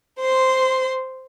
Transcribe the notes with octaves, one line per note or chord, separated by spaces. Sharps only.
C5 C6